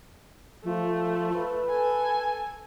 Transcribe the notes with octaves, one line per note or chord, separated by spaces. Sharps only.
F3 A3
B4
A4 G#5